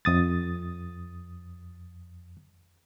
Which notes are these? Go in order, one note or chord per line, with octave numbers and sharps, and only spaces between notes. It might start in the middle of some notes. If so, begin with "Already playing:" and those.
F2 D#6 A6